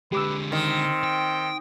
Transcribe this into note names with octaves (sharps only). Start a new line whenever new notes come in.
D3 G#3 G4 B4 D6 E6
D#3 C4
G5